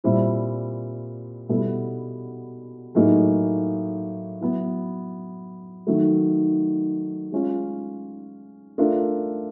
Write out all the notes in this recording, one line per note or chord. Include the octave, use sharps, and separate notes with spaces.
A#2 G3 C4 E4
B2 G3 B3 E4 A4
A2 F#3 A#3 D#4 G#4
F#3 B3 E4
D#3 F#3 A3
G#3 C#4 F4
A3 D4 F4 A#4